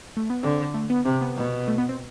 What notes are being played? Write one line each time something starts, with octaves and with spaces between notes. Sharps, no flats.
A3
B3
D3 C4
A3
B3
C3 C4
B3
B2
A3
B3
C4